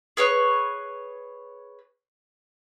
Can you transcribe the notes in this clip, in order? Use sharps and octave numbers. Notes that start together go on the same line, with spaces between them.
G#4 B4 C#5 C#6